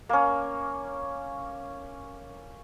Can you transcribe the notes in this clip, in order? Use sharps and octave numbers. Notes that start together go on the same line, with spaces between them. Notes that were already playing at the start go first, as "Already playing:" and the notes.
A#3 C#4